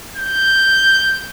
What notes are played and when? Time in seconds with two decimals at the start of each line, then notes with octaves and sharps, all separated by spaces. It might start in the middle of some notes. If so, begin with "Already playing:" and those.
0.16 G6